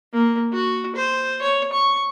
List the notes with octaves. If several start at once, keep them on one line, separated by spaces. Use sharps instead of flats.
A#3
F#4
C5
C#5
C#6